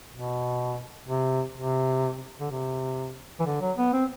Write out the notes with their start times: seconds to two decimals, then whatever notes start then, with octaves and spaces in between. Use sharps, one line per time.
0.14 B2
1.08 C3
1.56 C3
2.41 D3
2.50 C3
3.40 E3
3.46 D3
3.61 F#3
3.77 B3
3.93 C4